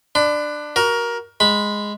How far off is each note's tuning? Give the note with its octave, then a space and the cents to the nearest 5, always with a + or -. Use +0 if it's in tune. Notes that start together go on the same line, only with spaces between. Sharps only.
D4 +15 B5 +40
F#4 +25 A#4 +15
G#3 +0 B5 +0